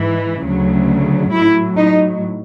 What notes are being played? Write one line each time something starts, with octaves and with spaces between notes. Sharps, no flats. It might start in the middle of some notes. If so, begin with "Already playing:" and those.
Already playing: G#2 E3
D2 C#3 F#3
A2 F#3 E4
D#4